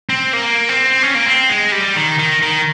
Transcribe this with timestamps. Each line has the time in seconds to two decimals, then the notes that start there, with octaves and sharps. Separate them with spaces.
0.10 C4
0.33 A#3
0.69 C4
1.03 C#4
1.15 A#3
1.27 C4
1.50 G#3
1.72 G3
1.96 D#3
2.19 D#3
2.42 D#3